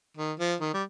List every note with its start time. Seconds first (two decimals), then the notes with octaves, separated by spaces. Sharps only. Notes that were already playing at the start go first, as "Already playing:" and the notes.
0.17 D#3
0.39 F3
0.60 D#3
0.74 G3